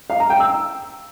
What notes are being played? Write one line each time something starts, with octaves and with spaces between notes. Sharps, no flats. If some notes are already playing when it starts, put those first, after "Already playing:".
F5
A#5
G5
E6